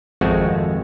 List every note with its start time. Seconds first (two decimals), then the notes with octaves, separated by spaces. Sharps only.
0.21 G#1 F2 G#3 A3 C4 F#4